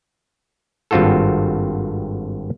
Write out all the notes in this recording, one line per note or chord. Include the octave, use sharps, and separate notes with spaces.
G#1 G2 C4 F4 F#4 A4